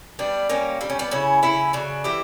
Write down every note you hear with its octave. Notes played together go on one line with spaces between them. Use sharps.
G3 B3 D4
G3 A#3 C#4
G3 D4
C#4
B3 D4
C#3 C#4 E4
C#3 C#4 E4
C#3 D4 F#4
E3 E4 G4